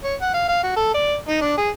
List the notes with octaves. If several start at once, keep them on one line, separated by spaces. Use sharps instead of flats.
C#5
F#5
F5
F5
F#4
A4
D5
D#4
D4
G#4